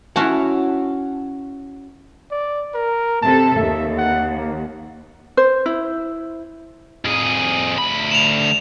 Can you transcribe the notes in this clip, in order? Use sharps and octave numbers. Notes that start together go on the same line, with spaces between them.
C#4 E4 F#4 E5 F#5 A5
D5
A#4
C3 A4 A5
D#2 E5
F#5
A#3
C5
E4
F2 G#4
D2 B5
E7 F7